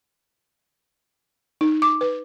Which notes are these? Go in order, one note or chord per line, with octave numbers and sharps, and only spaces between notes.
D#4
D6
B4